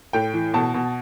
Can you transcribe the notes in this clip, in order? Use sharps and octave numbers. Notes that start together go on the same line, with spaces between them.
A2 G5
E3
B2 A5
B2